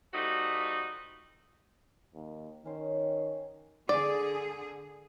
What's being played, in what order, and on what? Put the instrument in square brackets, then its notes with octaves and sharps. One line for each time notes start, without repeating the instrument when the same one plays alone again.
[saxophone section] F3 G3 A3 D#4 F#4
[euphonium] D#2
[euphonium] D#3 [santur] C#4 C5
[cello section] D3 G#4 [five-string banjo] D5